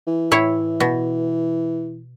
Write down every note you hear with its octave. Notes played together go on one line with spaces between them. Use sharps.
E3
A2 E4 C#5
B2